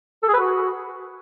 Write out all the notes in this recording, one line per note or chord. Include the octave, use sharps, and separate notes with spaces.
A4
G#4
B4
F#4